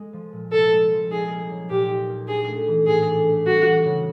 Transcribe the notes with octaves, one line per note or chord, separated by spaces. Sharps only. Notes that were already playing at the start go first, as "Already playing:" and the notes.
Already playing: G#3
F3
A#2
C2 A4
G#3
F3
D#4 G#4
A#3
F#3
A#2 G4
D#4
A#3
D4 G#4
A3
E3
A2 G#4
D4
A3
G3 F#4
E3
C#3